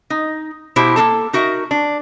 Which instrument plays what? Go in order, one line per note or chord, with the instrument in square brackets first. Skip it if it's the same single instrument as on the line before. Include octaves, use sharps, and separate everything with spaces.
[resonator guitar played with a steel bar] D#4
B2 E4 G4 C5
A#3 C4 A4 A5
D#4 F#4 A#4 E5
D4